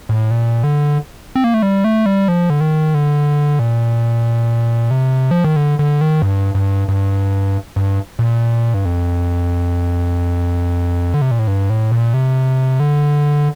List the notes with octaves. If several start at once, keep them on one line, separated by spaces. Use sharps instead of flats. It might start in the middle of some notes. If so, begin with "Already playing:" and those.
A2
A#2
D3
C4
A#3
A3
G3
A3
G3
F3
D3
D#3
D3
A#2
C3
F3
D#3
D3
D3
D#3
G2
G2
G2
G2
A#2
G2
F2
D3
C3
A#2
A2
G2
A2
A#2
C3
D3